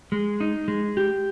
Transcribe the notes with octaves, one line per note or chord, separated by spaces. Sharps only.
G#3
D#4
G#3
G4